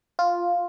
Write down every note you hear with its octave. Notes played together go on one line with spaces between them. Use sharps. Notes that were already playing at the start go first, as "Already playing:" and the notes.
F4